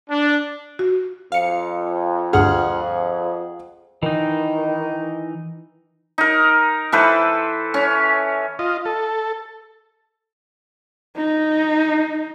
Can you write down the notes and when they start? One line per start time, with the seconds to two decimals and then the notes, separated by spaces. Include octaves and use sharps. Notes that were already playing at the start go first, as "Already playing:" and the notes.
0.10 D4
0.79 F#4
1.32 F2 F5 C#7
2.33 D2 G2 G#4 F#5 F6
4.03 D#3 E3 D#4
6.18 D#4 A#4
6.92 E3 A4 B4 C5
7.74 C#4
8.59 F4 D#5
8.85 A4
11.16 D#4